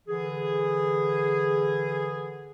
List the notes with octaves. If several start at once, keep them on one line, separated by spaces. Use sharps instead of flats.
D3 E3 G#4